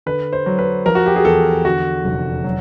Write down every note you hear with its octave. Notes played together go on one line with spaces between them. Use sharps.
D3 B4
C5
F#3
B4
F3 A#4
F#4
G4
G#4
E2 A4
D3 F#4
F1
F#3